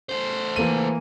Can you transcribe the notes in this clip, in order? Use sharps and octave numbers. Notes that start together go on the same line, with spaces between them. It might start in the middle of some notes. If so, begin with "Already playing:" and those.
A3 C5
E3 A#3 D#7